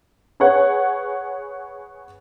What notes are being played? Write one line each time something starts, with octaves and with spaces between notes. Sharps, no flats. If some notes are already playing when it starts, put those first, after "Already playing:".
G#4 B4 C#5 F#5